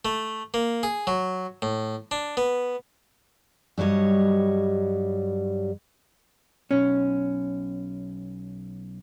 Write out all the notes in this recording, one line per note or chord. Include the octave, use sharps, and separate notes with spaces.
A3
A#3
G#4
F#3
A2
D4
B3
G2 F#3 G3 C#5 D#5
B1 C#4